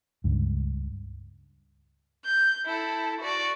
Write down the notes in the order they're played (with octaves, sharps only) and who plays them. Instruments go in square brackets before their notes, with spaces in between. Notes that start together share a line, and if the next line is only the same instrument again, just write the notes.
[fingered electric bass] C#2 G2
[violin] G6
E4 A4
F#4 D5